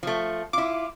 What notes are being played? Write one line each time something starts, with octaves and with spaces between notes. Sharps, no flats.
F3 A3
E4 F4 D6